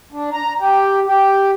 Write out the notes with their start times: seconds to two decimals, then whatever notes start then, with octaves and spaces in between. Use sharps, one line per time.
0.12 D4
0.33 A#5
0.60 G4
1.07 G4